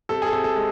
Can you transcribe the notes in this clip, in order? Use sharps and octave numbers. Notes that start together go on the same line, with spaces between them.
C3 A4
G#4
A4
C3
A4
G#3